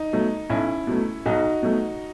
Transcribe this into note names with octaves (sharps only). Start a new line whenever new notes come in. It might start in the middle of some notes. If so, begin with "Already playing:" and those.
Already playing: D#4
B2 F#3 A3
B1 C#4 E4
B2 F#3 A3
B1 D#4 F#4
B2 F#3 A3